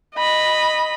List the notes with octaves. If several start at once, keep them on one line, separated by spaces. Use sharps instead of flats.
D#5 B5